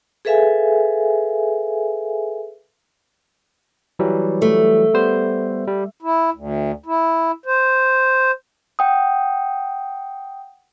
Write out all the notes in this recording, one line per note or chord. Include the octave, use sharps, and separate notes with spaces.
G#4 A4 B4 E5 F5 G#5
E3 F#3 G3
A3
G3 B3 C5
G3
E4
D2
E4
C5
F#5 G5 D#6